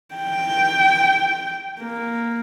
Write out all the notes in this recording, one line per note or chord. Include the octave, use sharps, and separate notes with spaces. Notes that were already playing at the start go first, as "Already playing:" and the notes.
G5
A#3